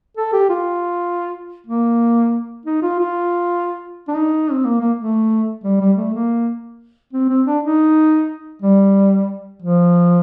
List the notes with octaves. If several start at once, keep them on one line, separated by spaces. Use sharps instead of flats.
A4
G4
F4
A#3
D#4
F4
F4
D4
D#4
C4
A#3
A#3
A3
G3
G3
A3
A#3
C4
C4
D4
D#4
G3
F3